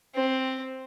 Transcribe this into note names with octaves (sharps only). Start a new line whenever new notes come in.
C4